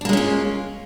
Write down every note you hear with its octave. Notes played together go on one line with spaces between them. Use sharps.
G#3 A#3 C#4 D4 F4